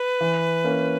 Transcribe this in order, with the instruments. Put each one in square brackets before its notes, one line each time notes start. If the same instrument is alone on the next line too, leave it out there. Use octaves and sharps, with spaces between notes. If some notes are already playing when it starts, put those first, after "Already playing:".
Already playing: [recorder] B4
[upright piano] E3
A#3 C#4